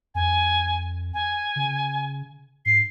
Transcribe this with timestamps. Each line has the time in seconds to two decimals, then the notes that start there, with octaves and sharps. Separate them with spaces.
0.15 F2 G#5
1.14 G#5
1.56 C#3
2.66 G#2 C7